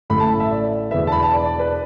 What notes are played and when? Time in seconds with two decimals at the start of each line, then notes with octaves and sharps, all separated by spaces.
0.10 A1 A2 A3 B5
0.20 A5
0.40 E5
0.51 D5
0.91 E1 E2 E3 B3 E5
1.07 A5
1.12 B5
1.23 A5
1.33 D5
1.46 D5
1.60 B4